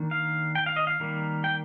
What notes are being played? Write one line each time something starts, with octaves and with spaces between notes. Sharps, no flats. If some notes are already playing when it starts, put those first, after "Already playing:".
Already playing: D#3 A#3 D4
F5
G5
F5
D#5
F5
D#3 G3 A#3
G5